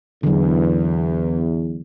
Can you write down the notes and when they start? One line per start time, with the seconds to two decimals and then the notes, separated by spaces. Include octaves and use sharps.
0.23 E2 D3 F#3